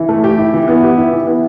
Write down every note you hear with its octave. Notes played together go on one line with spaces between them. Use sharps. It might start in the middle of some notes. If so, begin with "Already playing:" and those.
Already playing: E3
A3
G4
E4
E3
B3
G4
E4
E3
B3